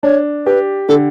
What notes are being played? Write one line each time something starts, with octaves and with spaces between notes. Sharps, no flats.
D4 C#5
G4 B4
D3 A4